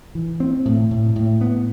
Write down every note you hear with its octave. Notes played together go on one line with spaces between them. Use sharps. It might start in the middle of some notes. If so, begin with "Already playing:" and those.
E3
C4
A2
A2
A2
B3